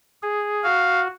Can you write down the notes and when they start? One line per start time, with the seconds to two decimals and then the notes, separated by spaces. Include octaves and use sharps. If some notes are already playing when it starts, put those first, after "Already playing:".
0.22 G#4
0.64 F#4 F5